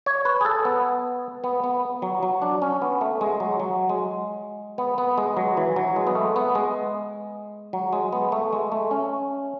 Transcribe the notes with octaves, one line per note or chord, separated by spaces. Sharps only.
C#5
B4
G#4
A4
B3
B3
B3
F#3
F#3
D4
C#4
B3
A3
G#3
F#3
F#3
G#3
B3
B3
G#3
F#3
E3
F#3
G#3
B3
A3
B3
G#3
F#3
G#3
B3
A3
G#3
A3
C#4